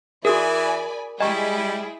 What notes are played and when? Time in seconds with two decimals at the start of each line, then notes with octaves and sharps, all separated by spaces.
0.25 E3 F#4 G#4 A#4 D5 G#5 B5 D#6
1.20 G3 G#3 E4 G#4 D#5 G5 A#5 C#6